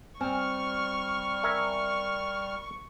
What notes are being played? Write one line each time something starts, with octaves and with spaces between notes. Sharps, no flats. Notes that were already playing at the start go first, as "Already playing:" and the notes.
G3 C4 G#5 C#6 F6
A#4 E5 G#5